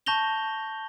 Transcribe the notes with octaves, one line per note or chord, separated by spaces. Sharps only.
A5 C#6 G6 A#6 F7 G7